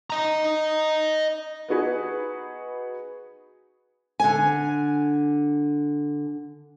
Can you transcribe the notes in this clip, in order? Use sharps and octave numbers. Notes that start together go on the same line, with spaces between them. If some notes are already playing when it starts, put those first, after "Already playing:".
D#5 A#5
B3 D#4 F#4 G#4 B4
D3 G#5